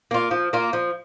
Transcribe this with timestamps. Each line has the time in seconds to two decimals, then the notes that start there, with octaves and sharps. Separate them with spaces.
0.11 A#3 F4
0.31 F3
0.53 A#3 F4
0.73 F3